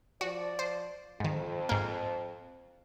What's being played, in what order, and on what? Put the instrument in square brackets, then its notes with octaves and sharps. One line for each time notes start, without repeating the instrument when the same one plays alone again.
[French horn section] F3 D5 [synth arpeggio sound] F#4
[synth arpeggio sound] C5
[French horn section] F2 [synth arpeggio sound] G#2 D#3
[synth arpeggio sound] G#2 A#3